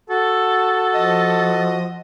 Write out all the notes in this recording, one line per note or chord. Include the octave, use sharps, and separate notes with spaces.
F#4 A4
F3 D#5